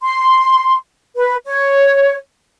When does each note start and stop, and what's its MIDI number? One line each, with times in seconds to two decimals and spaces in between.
0.02 0.75 84
1.17 1.36 71
1.46 2.16 73